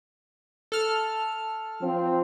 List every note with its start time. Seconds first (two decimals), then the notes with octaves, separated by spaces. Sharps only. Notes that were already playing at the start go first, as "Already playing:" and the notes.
0.72 A4 F6
1.81 F3 C4